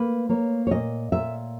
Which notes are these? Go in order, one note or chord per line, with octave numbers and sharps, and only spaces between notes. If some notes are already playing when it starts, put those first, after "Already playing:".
Already playing: A#3 B4
A#3 C#5
C#5
A#2 D#5
A#2 E5